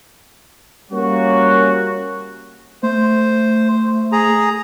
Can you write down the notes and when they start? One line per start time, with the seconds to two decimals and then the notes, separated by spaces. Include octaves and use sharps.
0.91 G3 A#3 C#4 F#4
2.83 A3 C5
4.12 G#4 A#5